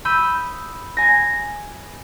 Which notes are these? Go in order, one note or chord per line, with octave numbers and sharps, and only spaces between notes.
B5 D#6 E6 G6
G#5 A#6